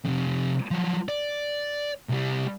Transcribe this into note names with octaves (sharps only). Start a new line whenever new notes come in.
F2 C3
F3 F#3
D5
C2 G3